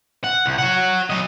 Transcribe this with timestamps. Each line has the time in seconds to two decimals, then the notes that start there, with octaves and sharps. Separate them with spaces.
0.24 F#5
0.46 C2
0.58 C#5 F#5
1.10 F#3 D#5